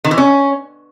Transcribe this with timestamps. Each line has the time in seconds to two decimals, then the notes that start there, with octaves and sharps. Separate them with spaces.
0.04 D#3
0.11 E3
0.18 C#4